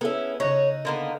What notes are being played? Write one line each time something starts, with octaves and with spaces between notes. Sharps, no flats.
B3 C#4 E4 G#4 A4 E5
C#3 D#4 C#5 F#6 A#6
D3 A#3 B3